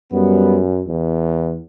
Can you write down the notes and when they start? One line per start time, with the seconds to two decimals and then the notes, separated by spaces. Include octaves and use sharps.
0.13 F#2 G3 B3
0.87 E2